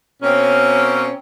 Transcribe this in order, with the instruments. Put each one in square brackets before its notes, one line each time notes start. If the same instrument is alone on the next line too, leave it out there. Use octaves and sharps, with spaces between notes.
[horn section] B2 A#3 C4 C#4